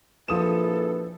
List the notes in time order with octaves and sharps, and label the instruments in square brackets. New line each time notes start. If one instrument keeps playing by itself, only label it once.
[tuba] A#1 [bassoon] E3 [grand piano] F3 D#6 E7 [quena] A4